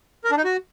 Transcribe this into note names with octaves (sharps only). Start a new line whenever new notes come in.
A#4
D4
D#4
F#4